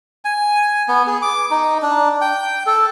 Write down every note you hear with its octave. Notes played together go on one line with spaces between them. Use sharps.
G#5
B3
G#4
D6
D#4
D4
G5
A4